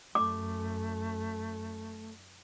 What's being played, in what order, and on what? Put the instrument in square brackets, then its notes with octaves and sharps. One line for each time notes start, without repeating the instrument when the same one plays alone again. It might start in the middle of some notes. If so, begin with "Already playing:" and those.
[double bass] F#2 [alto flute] A3 [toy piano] D6